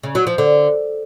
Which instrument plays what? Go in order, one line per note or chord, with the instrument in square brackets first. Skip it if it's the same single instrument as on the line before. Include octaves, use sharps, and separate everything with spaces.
[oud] C#3
F#3
F3
D3